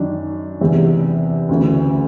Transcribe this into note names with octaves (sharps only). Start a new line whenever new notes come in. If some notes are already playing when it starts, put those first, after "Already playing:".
Already playing: F#2 D#3 D4
E2 C3 E3
D2 C#3 E3